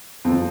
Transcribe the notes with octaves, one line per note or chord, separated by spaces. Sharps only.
F2